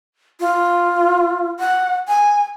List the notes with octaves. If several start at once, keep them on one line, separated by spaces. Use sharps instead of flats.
F4
F#5
G#5